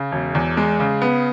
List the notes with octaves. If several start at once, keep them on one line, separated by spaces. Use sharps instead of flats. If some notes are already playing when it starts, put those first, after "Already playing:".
Already playing: C#3
E1
E2
G#3
C#3
B3